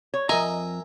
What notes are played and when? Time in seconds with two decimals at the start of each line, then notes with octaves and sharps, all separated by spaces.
0.14 C#5
0.29 F2 A#4 D#5 E5 G#5 A#5